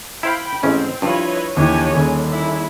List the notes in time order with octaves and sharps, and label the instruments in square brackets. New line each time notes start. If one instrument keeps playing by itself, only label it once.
[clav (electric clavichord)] E4 C5 F5 [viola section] G5 B5
[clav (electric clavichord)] A1 G#2 C#4 [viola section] C4
[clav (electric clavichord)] G2 [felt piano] F3 D4 F4 [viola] E4 B4 [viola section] C#5 D#5
[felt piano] D#2 D3 E3 [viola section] C#4 G#5 [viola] G4 C#5
[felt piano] D#1 D#2 G#4 [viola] D3
[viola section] E4